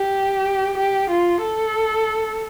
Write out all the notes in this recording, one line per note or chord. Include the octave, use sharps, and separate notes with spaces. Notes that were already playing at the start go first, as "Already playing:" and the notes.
Already playing: G4
G4
F4
A4